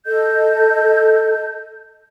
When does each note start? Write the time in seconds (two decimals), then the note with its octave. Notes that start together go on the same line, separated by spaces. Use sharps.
0.06 A4 D#5 G6